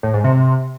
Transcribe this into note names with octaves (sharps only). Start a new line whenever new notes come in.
A2
G#2
C3